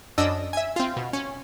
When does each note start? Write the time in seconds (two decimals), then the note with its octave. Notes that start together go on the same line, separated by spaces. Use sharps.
0.18 F#2 D4 D#5 E6
0.53 E5 G#5
0.76 C4 F4
0.97 B2
1.13 C#4